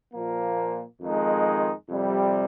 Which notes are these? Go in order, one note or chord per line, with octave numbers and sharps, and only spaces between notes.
A#2 F3 A#3
F2 D#3 G#3 D#4
F2 C3 G3